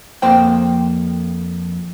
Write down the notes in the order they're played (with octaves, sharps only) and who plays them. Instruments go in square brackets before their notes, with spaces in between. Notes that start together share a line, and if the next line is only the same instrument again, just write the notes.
[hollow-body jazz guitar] F2 A#3 C5 G5